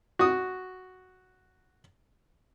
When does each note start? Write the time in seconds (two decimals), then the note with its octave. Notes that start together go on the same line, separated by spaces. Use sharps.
0.19 F#4 D#6